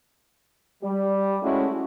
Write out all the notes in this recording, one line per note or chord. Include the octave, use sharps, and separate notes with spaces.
G3
G#3 A3 C#4 E4 F#4